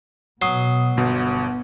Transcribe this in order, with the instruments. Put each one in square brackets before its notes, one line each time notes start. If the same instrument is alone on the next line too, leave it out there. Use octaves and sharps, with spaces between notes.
[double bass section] B2 [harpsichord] F#3 [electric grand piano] D#6 C7
[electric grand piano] G1 B2 [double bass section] B3